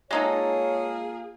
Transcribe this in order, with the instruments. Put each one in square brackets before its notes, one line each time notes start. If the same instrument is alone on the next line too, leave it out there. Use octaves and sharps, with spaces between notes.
[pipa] G#3 D#4 A4 [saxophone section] A#3 F4 G#4 [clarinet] C#5